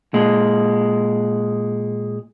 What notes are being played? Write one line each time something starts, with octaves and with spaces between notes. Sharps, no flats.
A#2 G#3